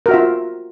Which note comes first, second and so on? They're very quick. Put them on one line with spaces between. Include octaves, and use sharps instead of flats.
A#4 F#4 E5 F4